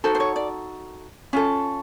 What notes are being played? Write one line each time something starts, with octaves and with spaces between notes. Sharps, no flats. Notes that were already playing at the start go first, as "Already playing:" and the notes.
D#4 F#4 A4 C5
C5
C#5
D5
C#4 F4 A4